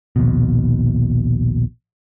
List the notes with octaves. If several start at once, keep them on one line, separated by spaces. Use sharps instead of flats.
A#1 D#2 B2